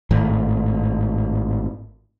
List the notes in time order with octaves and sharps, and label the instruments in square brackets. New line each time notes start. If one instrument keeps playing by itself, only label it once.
[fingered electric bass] G#1 A2